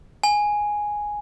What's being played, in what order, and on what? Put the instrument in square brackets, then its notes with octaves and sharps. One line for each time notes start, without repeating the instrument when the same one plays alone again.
[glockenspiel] G#5